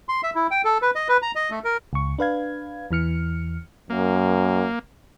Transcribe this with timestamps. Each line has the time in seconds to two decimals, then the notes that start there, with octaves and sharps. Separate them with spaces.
0.09 C6
0.23 E5
0.35 E4
0.51 G5
0.64 A4
0.82 B4
0.95 D#5
1.09 B4
1.22 A#5
1.35 D#5
1.50 A3
1.64 A#4
1.93 C#2 C#6
2.19 D4 B4 F5 G#6
2.91 E2 E3 F6 C#7
3.90 F#2 A#3